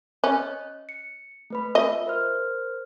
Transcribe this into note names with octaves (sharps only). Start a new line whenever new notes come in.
C#4 C#5 D#5 F#6
C#7
A3 B4 B5
F4 D#5 E5
A#4 C5 F6